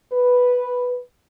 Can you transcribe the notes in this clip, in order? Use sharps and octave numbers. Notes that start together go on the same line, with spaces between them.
B4